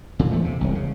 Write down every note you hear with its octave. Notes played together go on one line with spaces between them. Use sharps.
A#2 D3
E2 F3 A3
C3
E1 C2
C#3